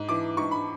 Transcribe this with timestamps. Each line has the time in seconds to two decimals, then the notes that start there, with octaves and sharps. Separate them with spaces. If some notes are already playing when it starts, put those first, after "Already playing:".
Already playing: G#2
0.09 E3 D6
0.37 G#2 C#6
0.51 B5